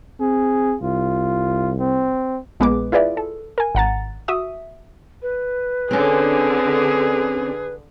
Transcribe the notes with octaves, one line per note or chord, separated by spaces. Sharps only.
C4 G#4
C2 F4
C4
A#1 G#3 B3 G#4 B4 D6
E4 F4 G#4 B4 D5 E5
A4
A#4 G#5
G#1 F#5 A#5 A6
F#4 E5 D#6
B4
D3 C4 C#4 G#4